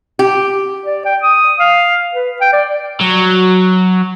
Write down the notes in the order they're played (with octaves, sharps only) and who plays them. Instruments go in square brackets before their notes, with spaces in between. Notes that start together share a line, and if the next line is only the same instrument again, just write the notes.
[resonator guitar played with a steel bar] G4
[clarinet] D5
G5
D#6
F5
B4
G5
D5
[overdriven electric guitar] F#3